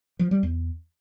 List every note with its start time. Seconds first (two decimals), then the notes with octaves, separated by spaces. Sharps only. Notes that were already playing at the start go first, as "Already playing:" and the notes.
0.19 F3
0.31 G3
0.43 E2